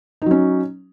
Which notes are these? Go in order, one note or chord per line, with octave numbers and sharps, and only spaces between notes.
F#3 C#4 D#4